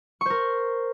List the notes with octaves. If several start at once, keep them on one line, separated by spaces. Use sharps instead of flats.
A#4 C5 C#6